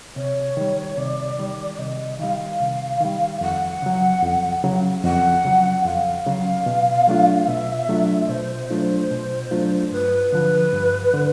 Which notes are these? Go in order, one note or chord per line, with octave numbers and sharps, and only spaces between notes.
C3 C#5
D#3 G3
C3 D5
D#3 G3
D5
C3 D#5
D#3 G3 F5
C3
D#3 G3
F2 F#5
C#3 F#3
F2
C#3 F#3
F2 F#5
C#3 F#3
F2 F5
C#3 F#3
B2
F#3 A3 D4 F4
B2 E5
F#3 A3 D4 F4
B2 C5
F#3 A3 D4 F4
B2
F#3 A3 D4 F4
G2 B4
D3 F3
G2
D3